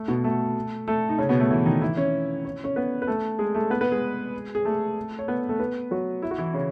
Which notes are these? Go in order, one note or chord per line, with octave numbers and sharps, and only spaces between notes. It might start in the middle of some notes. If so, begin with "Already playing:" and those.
Already playing: A3
B2 B3
A3 A4
A3 A4
D#4
C#3 C#4
B2 B3
A3
E3 E4
D#3 D#4
E3 E4
C#4 C#5
C#5
C#4 C#5
B3 B4
B4
A3 A4
G#3 G#4
A3 A4
B3 B4
B3 B4
G#3 G#4
G#4
A3 A4
C#5
B3 B4
A3 A4
B3 B4
F#3 F#4
E4
F#4
E3 E4
C#3 C#4